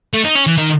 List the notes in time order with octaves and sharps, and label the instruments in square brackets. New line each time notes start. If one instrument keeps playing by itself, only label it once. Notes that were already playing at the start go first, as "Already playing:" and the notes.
[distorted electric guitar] A3
D#4
C#4
E3
D#3